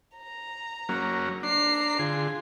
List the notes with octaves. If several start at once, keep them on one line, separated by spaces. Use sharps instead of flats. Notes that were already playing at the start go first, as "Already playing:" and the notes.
A#5
F#3 A#3 C#4
D4 A#5 C7
D3 F4 G#4